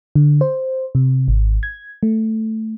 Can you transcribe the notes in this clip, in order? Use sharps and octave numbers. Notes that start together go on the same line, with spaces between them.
D3
C5
C3
G#1
G#6
A3